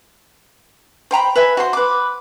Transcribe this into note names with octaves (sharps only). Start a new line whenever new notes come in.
C5 G5 A#5 B5
B4 E5 G#5
F#4 C5 C6
B4 D6